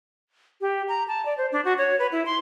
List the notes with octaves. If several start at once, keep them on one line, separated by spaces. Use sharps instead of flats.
G4
A#5
A5
D5
C5
D4
F#4
C#5
B4
E4
C6